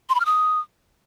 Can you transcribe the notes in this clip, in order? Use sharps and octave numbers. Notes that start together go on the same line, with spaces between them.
C6
B5
F6
D#6